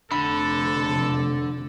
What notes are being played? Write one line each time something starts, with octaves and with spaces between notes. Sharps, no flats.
F1 D3 A4 B5